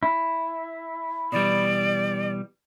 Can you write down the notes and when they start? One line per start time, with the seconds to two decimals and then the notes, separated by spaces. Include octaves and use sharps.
0.03 E4
1.32 B2 E3 G3 D5